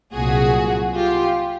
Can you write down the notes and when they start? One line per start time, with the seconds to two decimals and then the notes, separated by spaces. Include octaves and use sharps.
0.13 C2 A#2 F#3 F#4 G#4
0.95 F4 G4